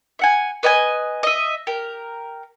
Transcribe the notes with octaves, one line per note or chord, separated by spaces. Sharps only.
E5 F#5 G#5
B4 D#5 G5 G#5
D#5 E5
G4 A#4